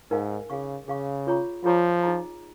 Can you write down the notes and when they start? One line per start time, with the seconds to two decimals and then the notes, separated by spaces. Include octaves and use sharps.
0.11 G#2 D#4 A#4 F5 G#5
0.50 C#3 G#4 F5 C#6
0.87 C#3 G#4 F5 C#6
1.27 F4 G#4 C#5 A#5 C#6
1.64 F3 F4 G#4 C#5 A#5 C#6
2.03 D#4 G#4 D#5 A#5